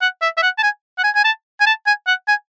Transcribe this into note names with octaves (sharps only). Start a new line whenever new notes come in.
F#5
E5
E5
F#5
A5
G#5
F#5
G#5
G#5
A5
G#5
A5
G#5
F#5
G#5